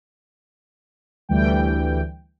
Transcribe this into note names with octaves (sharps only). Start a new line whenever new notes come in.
D2 E3 G3 G5